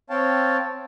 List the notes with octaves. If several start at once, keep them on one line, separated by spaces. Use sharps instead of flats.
C4 C#5 F5 G5 A5